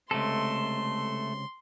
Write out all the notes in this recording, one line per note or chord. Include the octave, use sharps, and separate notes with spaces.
C#2 F#2 C3 A3 A4 C6